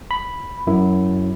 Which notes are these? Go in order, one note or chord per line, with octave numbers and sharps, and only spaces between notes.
B5
F#2 E4